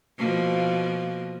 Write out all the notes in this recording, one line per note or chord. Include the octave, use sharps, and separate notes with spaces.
B2 F3 A#3